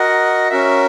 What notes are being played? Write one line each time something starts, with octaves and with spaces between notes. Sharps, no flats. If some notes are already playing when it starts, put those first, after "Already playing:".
Already playing: F#4 A#4 D#5 F#5
C#4 F#4 A#4 E5